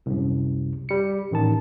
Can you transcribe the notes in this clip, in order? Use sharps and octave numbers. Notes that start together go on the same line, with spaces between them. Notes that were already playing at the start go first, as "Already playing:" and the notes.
C2 F#2
G3 C#7
A1 D#3 A5